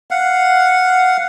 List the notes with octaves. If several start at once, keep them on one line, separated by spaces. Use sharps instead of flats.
F5 F#5